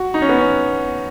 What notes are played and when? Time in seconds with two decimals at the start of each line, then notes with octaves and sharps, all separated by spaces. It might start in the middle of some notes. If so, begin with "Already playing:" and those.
Already playing: F#4
0.14 D#4
0.22 C#4
0.29 B3
0.38 C#4